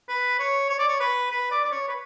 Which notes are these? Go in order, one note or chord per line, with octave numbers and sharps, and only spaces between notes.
B4
C#5
C#5
D5
C#5
B4
B4
D5
D5
C#5
B4